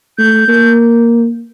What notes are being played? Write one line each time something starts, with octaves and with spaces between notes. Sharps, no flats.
A3 G6
A#3